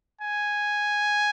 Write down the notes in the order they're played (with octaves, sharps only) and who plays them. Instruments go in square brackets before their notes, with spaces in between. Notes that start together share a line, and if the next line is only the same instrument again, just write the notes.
[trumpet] G#5